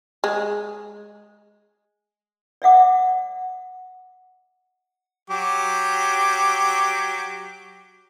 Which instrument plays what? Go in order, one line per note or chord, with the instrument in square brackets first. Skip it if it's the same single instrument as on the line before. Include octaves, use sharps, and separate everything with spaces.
[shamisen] G#3
[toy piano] D5 E5 F#5 D6
[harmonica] F#3 G4 D6